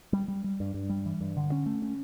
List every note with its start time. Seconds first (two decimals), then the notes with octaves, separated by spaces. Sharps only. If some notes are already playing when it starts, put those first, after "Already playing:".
0.13 G3
0.28 G3
0.44 G3
0.60 G2
0.74 G2
0.90 G3
1.06 E3
1.21 G2
1.37 D3
1.52 C#4
1.66 A3
1.82 C#4